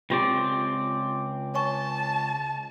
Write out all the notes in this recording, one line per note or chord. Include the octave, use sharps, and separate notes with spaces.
C#2 C4 D4 F4 G4 D5
C#5 G#5 A5 C#6